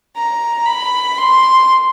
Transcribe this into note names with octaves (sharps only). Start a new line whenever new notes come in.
A#5
B5
C6